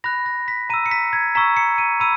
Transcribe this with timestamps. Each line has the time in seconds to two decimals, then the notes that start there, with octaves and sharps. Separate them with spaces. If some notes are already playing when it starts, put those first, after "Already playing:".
0.04 B5 F#6 A#6
0.26 A#6
0.48 B6
0.70 A#5 E6 D#7
0.86 C#7
0.91 B6
1.13 G#6
1.35 A#5 C#6 E6 B6
1.57 C#7
1.78 D#7
2.00 B5 E6 D#7